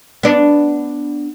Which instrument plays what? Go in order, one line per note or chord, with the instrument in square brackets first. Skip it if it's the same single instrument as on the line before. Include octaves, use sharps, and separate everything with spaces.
[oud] B3 D4